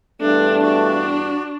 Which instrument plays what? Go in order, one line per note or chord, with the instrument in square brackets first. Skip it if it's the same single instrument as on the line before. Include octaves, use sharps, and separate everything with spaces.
[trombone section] E2 G2 [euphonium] A3 [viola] D4
[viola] D4 [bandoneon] F#4